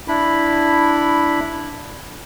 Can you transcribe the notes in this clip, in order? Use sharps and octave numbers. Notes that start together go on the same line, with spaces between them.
D4 E4 B5